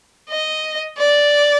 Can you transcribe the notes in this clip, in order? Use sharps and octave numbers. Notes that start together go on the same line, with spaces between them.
D#5
D5